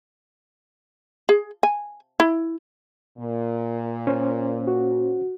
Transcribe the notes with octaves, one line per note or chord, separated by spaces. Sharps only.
G#4
G#5
E4
A#2
C#4 C5
F#4